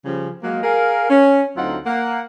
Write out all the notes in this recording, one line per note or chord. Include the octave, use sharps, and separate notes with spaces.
C#3 F3 G3
F#3 G#3 A#3
G#4 A#4 F5
C#4
D2 F#3 C4 D#4 F4 F#5
A#3 F#5